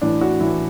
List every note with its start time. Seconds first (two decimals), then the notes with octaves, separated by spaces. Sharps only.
0.01 A1 A2 E3 D4
0.21 F#4
0.40 A1 A2 E3 E4